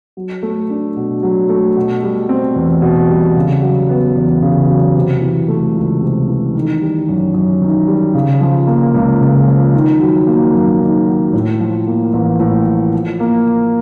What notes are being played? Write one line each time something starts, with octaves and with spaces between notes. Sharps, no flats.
F#3
A3
D4
B2
F#3
A3
B2
G3
C4
E2
B2
G3
C#3
F#3
B3
E2
C#3
F#3
C3
E3
A3
C#2
C3
E3
D#3
G3
F#2
F#2
D#3
G3
C#3
F3
A#3
C#2
C#3
F3
D#3
F#3
A#3
F#2
D#3
F#3
A2
F3
A#3
A1
A2
F3
F3
A#3